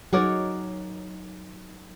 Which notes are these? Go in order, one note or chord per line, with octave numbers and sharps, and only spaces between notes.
F#3 D#4 G#4 A#4 C#5 F#5 D6 A6